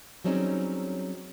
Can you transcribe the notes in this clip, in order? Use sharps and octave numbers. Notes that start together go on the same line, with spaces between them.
F#3 G3 C4 C#4 D#4 G#4